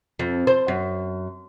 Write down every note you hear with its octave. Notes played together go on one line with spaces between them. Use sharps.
F2
C5
F#2